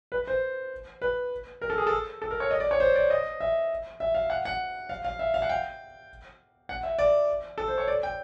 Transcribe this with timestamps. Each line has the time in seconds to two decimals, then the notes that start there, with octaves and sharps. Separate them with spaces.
0.12 B4
0.27 C5
1.02 B4
1.61 A#4
1.70 A4
1.78 G#4
1.87 A4
2.22 A4
2.31 A#4
2.40 C#5
2.51 D#5
2.60 D5
2.71 C#5
2.80 C5
2.95 D5
3.10 D#5
3.40 E5
4.00 E5
4.15 F5
4.30 F#5
4.45 F#5
4.89 F5
5.05 F5
5.19 E5
5.34 F5
5.42 F#5
5.49 G5
6.69 F#5
6.83 E5
6.99 D5
7.58 A4
7.68 C5
7.78 C#5
7.88 D5
8.03 G5